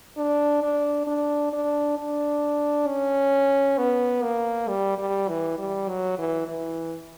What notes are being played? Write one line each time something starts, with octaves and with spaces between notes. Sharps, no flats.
D4
D4
D4
D4
D4
C#4
B3
A#3
G3
G3
E3
G3
F#3
E3
E3